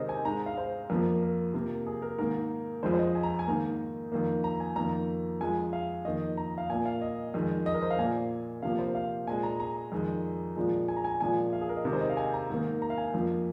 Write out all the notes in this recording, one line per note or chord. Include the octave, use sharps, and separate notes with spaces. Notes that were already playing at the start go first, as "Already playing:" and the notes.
Already playing: C3 D#3 G#3 A#4 C5 D#5
G#5
G#2 G#3 A#5
F5
C5
F2 F3 A#3 A#4
A#4
C3 F3 A#3
G#4
A#4
G#2 D#3 A#3 A#4
F2 F3 G#3 C5
C5
D#5
G#5
A#5
G#5
G#2 D#3 A#3 A#5
F2 D#3 A#3
A#5
G#5
F2 D#3 A#3 A#5
F2 F3 G#3 G#5
F5
F2 D#3 A#3 D#5
A#5
F5
A#2 A#3 G#5
F5
D#5
F2 D#3 G#3
D#5
A#4
C5
F5
A#2 A#3 G#5
C3 F3 A#3 F5
C5
F5
A#2 G#3 G#5
A#5
A#5
F2 D#3 G#3
A#2 F3 G#3
G#5
A#5
G#5
A#2 F3 G#3 G#5
F5
G#4
A#4
D#5
C3 D#3 G#3 A#4
C5
D#5
F5
G#5
A#5
G#2 D#3 A#3
A#5
F5
G#5
F2 F3 A#3